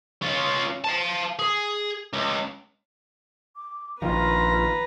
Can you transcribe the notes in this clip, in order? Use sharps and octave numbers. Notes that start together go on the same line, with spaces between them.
C#4 F4
F5 A5
G#4
C#2
D6
A#1 D#3 F3 F4 B4 A#5